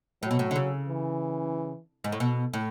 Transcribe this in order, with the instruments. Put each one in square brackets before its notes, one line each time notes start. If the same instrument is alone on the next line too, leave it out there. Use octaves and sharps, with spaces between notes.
[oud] A2 [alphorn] F#3
[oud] B2
A2
D3
C#3
[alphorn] E3
[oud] G#2
A2
B2
A2